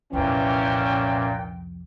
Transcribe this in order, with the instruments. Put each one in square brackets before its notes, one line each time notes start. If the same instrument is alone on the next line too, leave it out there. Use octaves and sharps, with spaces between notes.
[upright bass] C2 F2 [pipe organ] A#2 [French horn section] E3 C#4 [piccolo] G5